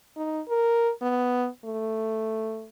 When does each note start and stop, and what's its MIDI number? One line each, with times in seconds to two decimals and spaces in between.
0.16 0.40 63
0.49 0.91 70
1.02 1.48 59
1.65 2.68 57